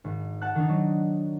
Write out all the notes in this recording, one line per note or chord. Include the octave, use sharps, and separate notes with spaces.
G#1
F#5 A5 F#6
D#3 D4 D#4
F#3